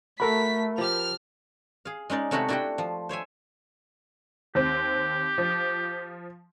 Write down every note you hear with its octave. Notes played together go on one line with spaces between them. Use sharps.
A3 F#4 A4 A#4 B5 B6
F3 G4 F6 F7
G#4 F5
G#3 C#4 D#4 D5
C3 A3 D#4 F#4 C#5 B5
D4 E4 F#4 G4 F#5 G5
F3
C5 C#5 E5 G#5
D#2 C4 G4
F3